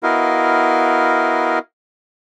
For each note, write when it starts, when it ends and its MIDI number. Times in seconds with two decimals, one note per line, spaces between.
0.03 1.59 59
0.03 1.59 64
0.03 1.59 66
0.03 1.59 70
0.03 1.59 75
0.03 1.59 77